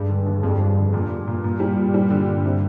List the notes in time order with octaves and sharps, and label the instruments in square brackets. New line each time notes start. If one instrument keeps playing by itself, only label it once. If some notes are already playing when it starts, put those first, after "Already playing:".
Already playing: [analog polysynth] G2 [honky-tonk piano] G#3
[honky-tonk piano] D3
D#2
[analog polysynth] F2 [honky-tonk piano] G#3
[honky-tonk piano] D4
D3
[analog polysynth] G2 [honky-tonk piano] A#2
[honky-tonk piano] A#2
A#2
A#2
G3
A#2
G3
D3
D3
C3